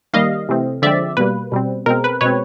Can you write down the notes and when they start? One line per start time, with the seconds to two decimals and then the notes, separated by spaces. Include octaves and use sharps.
0.14 D#3 G3 A#3 D#5 F5
0.49 C3 E3 A3 C4
0.82 D3 F3 G#3 C4 D5 E5
1.17 B2 G3 A#3 B4
1.52 B2 G3 C4
1.86 B2 G#3 C4 A#4
2.04 B4
2.21 B2 G#3 C4 B4 C#5